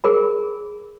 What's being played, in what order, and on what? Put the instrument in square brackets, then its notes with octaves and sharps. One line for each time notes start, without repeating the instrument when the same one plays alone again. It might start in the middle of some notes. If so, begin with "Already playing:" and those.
[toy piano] G#4 A#4 B5